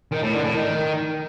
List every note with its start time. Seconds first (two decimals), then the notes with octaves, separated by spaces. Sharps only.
0.12 D#3
0.22 A2
0.33 D3
0.44 A2
0.55 D#3